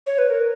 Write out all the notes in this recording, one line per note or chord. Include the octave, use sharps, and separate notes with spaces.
C#5
B4
A#4